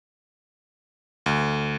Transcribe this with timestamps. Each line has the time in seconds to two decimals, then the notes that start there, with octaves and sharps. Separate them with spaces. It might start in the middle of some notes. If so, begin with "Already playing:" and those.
1.26 D2